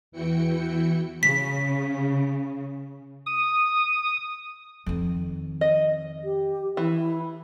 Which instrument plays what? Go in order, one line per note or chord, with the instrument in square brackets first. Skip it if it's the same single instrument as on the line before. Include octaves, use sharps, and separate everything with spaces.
[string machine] E2 E3 E4 F#4 G5 C#7
[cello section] C#3 [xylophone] B6
[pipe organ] D#6
[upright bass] F2 D#3
[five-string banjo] D#5
[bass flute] G4
[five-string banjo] E3 [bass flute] E4